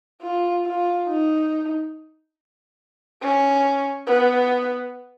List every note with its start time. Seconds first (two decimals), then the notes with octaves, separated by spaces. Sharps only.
0.22 F4
0.65 F4
1.08 D#4
3.22 C#4
4.07 B3